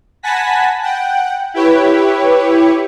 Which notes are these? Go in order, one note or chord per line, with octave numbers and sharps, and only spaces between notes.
F#5 G#5 A5 B5 A#6 B6
F#5 G5
E4 G4 B4 C#5